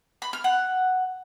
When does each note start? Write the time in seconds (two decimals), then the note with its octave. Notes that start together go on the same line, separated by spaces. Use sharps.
0.22 B5
0.33 F6
0.44 F#5